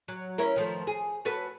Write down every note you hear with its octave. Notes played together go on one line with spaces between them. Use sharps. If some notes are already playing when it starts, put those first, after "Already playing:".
F#3
C#4 E4 A#4
D#3 F3 A3
G#4
F#4 A4 B4